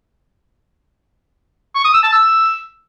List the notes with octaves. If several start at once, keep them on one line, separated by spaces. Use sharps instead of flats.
C#6
D#6
E6
A5
E6